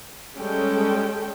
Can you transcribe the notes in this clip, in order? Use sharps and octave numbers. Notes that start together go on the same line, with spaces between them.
G3 G#3 C#4 A4 G5